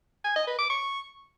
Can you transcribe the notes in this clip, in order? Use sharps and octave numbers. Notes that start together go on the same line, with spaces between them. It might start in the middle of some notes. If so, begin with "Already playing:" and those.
G#5
D#5
B4
D6
C#6